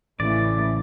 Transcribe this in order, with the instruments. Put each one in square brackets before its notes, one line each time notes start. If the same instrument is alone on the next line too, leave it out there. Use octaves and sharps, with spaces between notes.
[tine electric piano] A1 [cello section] C#3 E3 A3 [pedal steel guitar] D5